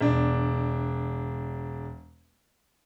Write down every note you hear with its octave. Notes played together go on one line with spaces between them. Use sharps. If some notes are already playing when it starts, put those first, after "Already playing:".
E1 D4